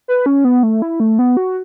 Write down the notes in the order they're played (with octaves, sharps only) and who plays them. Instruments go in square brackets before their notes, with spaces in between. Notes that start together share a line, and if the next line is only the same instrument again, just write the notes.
[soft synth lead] B4
C#4
B3
A3
E4
A3
B3
F#4